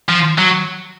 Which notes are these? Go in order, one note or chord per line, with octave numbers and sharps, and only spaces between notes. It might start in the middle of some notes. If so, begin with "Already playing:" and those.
F3
F#3